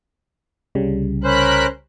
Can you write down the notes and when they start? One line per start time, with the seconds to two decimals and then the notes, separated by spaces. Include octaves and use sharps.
0.75 C2 C#3 G3
1.24 C#4 A#4 C5 B5 F#6